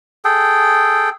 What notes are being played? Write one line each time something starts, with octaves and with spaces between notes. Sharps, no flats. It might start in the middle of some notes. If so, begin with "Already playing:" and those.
G#4 A4 G5